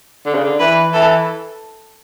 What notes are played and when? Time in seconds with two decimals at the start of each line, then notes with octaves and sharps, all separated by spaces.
0.26 D3
0.35 C#3
0.44 D3
0.59 E3 B4
0.92 E3 A4